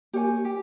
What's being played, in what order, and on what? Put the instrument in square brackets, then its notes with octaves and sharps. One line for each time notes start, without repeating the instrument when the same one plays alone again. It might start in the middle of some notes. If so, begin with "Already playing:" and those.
[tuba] A#3 [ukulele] G4 C#5 G#5
[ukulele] G4